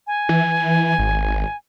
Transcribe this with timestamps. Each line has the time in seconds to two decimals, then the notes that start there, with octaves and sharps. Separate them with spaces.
0.07 G#5
0.29 E3
0.99 G#1